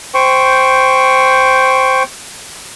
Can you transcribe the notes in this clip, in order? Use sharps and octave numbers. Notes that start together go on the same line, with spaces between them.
C5 G5 C#6